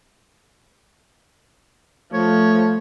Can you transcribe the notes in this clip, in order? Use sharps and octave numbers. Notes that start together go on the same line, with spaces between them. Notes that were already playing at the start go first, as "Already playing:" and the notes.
F3 A3 C#5